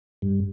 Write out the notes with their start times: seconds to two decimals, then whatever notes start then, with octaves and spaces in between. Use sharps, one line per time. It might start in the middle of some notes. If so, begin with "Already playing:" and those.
0.22 G2